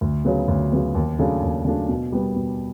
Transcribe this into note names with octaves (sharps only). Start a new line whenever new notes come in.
D2
C#3 F#3 B3
D2
C#3 F#3 B3
D#2
C#3 F#3 A3 D4
D#2
C#3 F#3 A3 D4
B2
G3 B3
B2